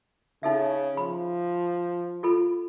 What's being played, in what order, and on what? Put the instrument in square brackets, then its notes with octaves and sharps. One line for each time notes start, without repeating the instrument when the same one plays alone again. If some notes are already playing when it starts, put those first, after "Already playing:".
[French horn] C#3 [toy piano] D#4 A4 E5
[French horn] F3 [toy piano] B5
[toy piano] F4 A4 B5